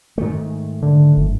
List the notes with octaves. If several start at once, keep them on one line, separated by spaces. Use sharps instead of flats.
G#2 D#3 A3
D3
F#1